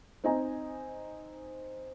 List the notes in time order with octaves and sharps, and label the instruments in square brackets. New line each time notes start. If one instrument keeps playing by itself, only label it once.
[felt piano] C4 D#4 D#5 G#5 A#5